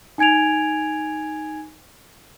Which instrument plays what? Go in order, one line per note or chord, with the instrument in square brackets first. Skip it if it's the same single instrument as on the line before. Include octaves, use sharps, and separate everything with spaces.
[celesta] D#4 G#5 G#6 D7 F7